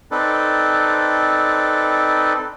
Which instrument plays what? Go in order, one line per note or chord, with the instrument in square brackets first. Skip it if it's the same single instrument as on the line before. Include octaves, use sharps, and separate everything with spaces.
[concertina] C4 D#4 A4 B4 D5